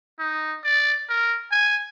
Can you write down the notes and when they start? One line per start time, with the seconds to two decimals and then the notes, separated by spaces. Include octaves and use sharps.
0.19 D#4
0.64 D5
1.09 A#4
1.52 G#5